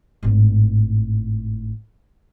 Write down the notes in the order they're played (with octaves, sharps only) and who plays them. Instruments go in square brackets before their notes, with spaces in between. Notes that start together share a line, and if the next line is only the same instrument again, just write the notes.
[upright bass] G#1 A2